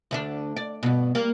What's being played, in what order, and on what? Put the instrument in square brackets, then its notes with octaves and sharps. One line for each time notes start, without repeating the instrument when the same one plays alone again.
[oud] D2 A3 D4
D5
G2 B2
G3 A#3